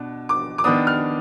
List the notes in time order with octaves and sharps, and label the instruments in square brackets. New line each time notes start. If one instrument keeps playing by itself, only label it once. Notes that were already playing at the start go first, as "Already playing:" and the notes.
Already playing: [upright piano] B2 D4
D6
D6
D#3 B3 D4 D#6
F6